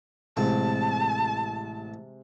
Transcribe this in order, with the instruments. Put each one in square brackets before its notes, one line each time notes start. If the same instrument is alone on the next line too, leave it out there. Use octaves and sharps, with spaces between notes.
[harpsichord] A1 C4 [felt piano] C3 G#3 [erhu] A5